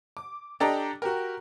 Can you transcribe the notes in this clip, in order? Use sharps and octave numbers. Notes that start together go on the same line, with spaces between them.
D6
D4 G4 A4 D5 D#5 A#5
F#4 G4 A#4